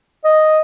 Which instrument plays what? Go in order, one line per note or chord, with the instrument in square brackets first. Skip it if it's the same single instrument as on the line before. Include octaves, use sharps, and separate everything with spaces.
[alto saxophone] D#5